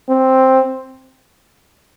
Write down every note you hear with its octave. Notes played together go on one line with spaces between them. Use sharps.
C4